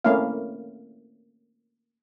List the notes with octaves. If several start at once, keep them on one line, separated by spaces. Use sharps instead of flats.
A3 A#3 C4 C#4 E4 F5